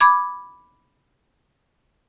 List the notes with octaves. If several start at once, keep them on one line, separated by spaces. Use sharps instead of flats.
B5 D6 G#6